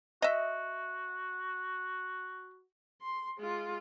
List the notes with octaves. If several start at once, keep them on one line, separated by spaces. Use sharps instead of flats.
F#4 D#5 E5
C6
G#3 F4